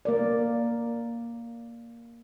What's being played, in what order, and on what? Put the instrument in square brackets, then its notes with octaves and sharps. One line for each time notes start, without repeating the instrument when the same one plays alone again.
[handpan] A#3 A#4 D5